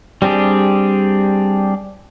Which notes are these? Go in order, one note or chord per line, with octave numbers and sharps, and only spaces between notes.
G3 C4 D4 G4 G#4